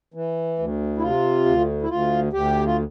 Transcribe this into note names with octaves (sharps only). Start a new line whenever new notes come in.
E3
D2
E4
C3 F4
D2
E4
D2 F4
D2 G4
F4